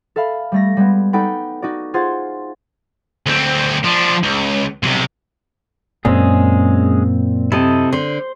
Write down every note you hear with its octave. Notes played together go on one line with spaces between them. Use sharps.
A4 E5 F5 B5
G3 A3 A#6
G3 G#3 B3
D#4 A4 D5 F#5 G5 B5
D#4 F#4 D5
F4 G#4 C5 F#5 C6 A6
D2 C4
F3 D4
C#2
B1 C3
F#2 A#2 G#3 C4 C#4 G#4
C3 E4 A4 D#5
D3 C5 C6